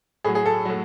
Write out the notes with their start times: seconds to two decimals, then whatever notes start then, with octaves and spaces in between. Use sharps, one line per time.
0.24 A2 F#3 G#4
0.35 G#4
0.46 A4
0.65 A2 F#3